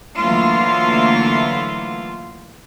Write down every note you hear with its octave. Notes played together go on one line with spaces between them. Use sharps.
D3 E3 F#3 A3 A#3 F4